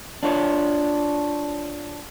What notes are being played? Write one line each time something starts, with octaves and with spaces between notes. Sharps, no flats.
D4 F4 C#5